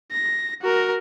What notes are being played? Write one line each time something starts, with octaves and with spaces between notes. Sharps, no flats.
A#6
F#4 A#4